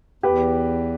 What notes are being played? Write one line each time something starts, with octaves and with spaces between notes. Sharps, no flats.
E2 G4 B4